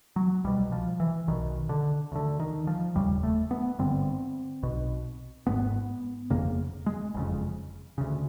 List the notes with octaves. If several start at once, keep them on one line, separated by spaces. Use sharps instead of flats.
F#3
C2 B2 G3
F3
E3
B1 B2 D#3
D3
D2 D3
D#3
F3
F1 D#2 C#3 G3
A3
B3
G#1 G2 D3 C4
B1 B2
G#1 G#2 B3
G1 F2 C#3 A#3
G#3
F#1 F2 C#3
D2 C#3